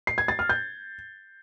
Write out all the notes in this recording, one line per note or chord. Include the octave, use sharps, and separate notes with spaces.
C7
G#6
A6
F6
G6